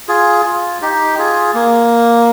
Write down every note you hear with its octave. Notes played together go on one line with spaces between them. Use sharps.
F4 G#4
F4
D#4 G4
F4 G#4
A#3